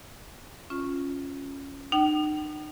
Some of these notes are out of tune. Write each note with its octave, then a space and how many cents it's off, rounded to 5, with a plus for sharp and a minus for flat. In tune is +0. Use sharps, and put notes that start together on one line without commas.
C#4 +0 F4 +0
D#4 -40 G5 -45